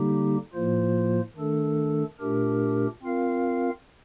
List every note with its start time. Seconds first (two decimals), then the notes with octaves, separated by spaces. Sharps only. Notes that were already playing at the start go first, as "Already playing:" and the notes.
Already playing: D3 G3 A#3 D#4 G4
0.54 A2 F3 A#3 F4 C5
1.36 D#3 A3 D4 A4
2.20 A#2 A3 D4 G4 A#4
3.03 C4 F4 A#4 F5